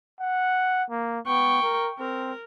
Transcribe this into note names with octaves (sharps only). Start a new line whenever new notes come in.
F#5
A#3
B3 G5 C#6
A#4
C4 A#4